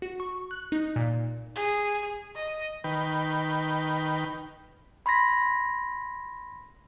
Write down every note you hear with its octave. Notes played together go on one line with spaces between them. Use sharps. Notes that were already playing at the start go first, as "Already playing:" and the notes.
F#4
C#6
F#6
D#4
A#2
G#4
D#5
D#3 B4 G5
B5 C6 G#6 A#6 B6